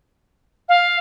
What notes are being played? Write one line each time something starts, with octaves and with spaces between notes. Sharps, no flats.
F5